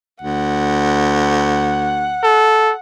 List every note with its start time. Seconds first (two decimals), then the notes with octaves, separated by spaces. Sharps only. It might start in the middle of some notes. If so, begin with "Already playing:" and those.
0.22 D2 F#5
2.23 A4